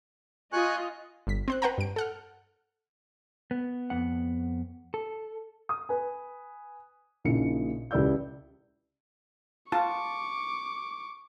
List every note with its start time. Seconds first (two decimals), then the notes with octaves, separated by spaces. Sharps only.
0.53 F4 D#5 G#5 C#6 F#6
1.27 G1 B6
1.48 C4 C5 F#6
1.62 B4 C5 F#5 G5 A5 A#5
1.78 G2 D7
1.96 A4 F#5 F6
3.51 B3
3.90 F2 B3 F#5
4.94 A4
5.69 D#6
5.89 B4 G#5
7.24 A#1 A#2 C#3 D#4 E4 C#7
7.91 C#2 E4 G4 D5 E6 G6
9.72 F4 A5 C#6 D6